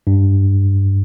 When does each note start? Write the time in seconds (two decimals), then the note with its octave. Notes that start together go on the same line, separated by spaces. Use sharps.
0.07 G2